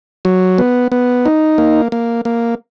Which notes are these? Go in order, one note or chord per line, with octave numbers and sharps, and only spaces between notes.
F#3
B3
B3
D#4
A#3
A#3
A#3